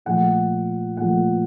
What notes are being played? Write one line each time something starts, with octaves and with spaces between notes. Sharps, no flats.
A#2 F3 A3 F#5
A#2 F3 A3 F#5